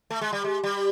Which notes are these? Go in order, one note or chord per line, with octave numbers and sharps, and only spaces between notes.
A3
G#3
G3
G#3
G3